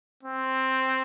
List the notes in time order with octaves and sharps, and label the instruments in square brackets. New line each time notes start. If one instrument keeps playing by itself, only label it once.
[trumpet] C4